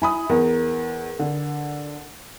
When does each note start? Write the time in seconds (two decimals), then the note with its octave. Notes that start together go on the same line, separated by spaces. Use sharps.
0.02 E4 G#5 B5 D#6
0.29 E2 A#4
1.19 D3